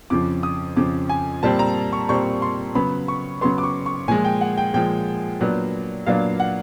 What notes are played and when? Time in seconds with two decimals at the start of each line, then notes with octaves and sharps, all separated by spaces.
0.10 F2 C#3 F3 D6
0.43 D#6
0.76 F2 C#3 F3 D6
1.09 G#5
1.43 A#2 G3 C4 A5
1.59 A#5
1.93 C#6
2.09 A#2 G3 C4 C#6
2.42 C6
2.75 C#3 F#3 B3 B5
3.08 C#6
3.41 C#3 F#3 B3 C6
3.58 D6
3.63 C#6
3.86 C#6
4.08 A#2 F3 G#3 G#5
4.25 G5
4.41 F#5
4.58 G5
4.74 A#2 F3 G#3 G5
5.40 A#2 F#3 B3 D4
6.06 A#2 F#3 B3 D4 F5
6.40 F#5